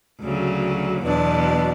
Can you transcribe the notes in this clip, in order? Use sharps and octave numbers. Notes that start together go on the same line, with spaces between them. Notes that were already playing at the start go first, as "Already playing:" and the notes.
D2 C#3 F#3
E2 B2 F#3 B3 D4